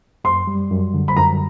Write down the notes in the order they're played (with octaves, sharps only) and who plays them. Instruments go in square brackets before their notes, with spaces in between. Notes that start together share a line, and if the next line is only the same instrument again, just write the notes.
[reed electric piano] F#2 [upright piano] C6
[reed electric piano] G3
F#2
D3
[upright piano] B5
[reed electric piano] F#2 [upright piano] A#5